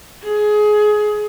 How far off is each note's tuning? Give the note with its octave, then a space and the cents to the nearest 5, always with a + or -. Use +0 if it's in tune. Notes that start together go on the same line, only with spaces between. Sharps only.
G#4 +20